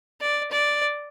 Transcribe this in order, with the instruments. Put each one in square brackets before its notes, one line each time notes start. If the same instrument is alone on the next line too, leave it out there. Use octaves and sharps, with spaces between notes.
[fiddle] D5
D5